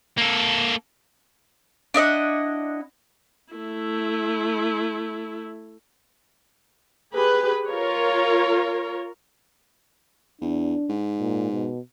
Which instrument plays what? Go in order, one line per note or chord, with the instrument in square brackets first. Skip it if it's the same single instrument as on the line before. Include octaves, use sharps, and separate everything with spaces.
[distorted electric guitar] A#3 A4
[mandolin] D4 E4 D#5 F#5
[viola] A3 E4
[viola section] G4 G#4 B4
F4 A#4 C#5
[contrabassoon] E2 [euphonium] D4
[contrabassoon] G#2
[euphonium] A#2
B2